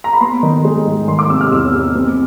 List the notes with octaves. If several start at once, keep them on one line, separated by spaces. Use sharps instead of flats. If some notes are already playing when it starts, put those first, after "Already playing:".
A#5
B5
B3 C6
D#3
G#3
G#2
D#3 C6
D6
C3 E6
F6
E2 E6
E2
C4